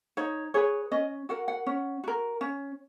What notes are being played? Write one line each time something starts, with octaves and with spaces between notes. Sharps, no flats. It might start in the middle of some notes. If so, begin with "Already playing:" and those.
D#4 C#5
G#4 B4 C#5
C#4 D#5
F#4 A#4 F#5
F#5
C#4
F#4 A#4
C#4